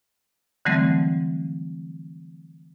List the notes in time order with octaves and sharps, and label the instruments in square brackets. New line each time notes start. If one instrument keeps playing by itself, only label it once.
[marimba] D3 E3 F#3 G3 A3 C4